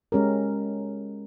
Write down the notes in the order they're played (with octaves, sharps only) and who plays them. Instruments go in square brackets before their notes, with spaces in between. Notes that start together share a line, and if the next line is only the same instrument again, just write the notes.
[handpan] G#3 C#4 G4 A#4